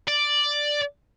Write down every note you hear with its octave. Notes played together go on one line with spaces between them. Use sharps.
D5